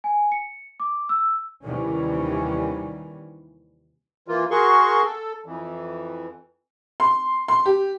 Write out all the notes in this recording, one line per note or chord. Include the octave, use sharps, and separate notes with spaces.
G#5
C#7
D6
E6
D#2 C3 D#3 E3 G3 C#4
E3 A#3 F4
F#4 G#4 A#4 C6 C#6
A4
F2 E3
C6
C6
G4